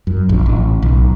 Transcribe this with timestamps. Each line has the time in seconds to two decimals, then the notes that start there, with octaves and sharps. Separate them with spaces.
0.07 F#2
0.29 A#1
0.46 A1
0.83 B1